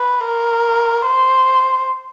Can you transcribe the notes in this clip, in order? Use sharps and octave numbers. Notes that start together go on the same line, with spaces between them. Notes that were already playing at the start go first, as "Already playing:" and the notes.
Already playing: B4
A#4
C5